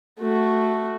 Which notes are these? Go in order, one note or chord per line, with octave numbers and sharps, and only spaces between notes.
A3 F#4